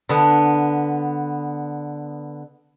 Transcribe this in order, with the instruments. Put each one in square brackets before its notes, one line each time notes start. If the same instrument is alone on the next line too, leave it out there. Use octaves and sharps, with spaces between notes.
[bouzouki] D3 B3